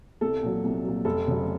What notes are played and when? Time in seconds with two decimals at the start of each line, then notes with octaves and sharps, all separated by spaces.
0.21 C2 A4
0.43 A#2 F#3
0.64 C2
0.84 A#2 F#3
1.05 F1 A4
1.27 F2 C#3 F#3